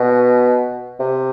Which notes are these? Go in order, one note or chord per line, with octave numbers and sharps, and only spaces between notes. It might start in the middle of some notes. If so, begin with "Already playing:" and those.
Already playing: B2
C3